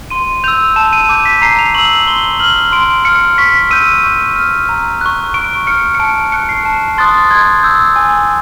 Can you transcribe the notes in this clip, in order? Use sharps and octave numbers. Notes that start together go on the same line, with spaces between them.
C6 D#7
E6 G6 F7
A5 E7
D#7
D6 G6
B6
A#5 C7
F7
C#6 E6 F#7
F#7
C6 G7
F6 F#7
C6 D7
F6 C#7
C#6 B6
E6 G6 D#7
C#6
F6
A#5
C#6 F#6
C#6 D7
F6 C#7
C#7
A5 D7
C#6 F#6 C#7
C7
A5
C6 D#6 F#6 A6
C6 G#6
E6 G6
G#5